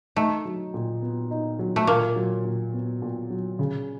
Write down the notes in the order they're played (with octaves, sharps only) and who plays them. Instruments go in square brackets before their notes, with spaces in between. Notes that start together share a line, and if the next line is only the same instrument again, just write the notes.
[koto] A3 [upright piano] D#4
[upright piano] F#3
A#2
B3
D#4
F#3
[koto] A3
[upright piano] A#2 [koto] A#3
[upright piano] F#3
A#2
B3
A#2
F#3
C#3